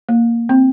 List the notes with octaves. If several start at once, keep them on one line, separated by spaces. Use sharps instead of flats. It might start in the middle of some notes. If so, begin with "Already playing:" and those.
A#3
C4